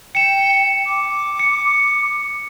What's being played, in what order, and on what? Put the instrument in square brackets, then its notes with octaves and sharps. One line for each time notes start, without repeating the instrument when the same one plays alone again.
[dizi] G5 [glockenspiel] C#7 E7
[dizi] D6
[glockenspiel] C#7